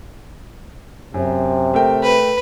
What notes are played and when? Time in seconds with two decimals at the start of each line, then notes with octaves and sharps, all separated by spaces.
1.14 F#2 C3
1.74 A3 A#4 G5
2.03 B4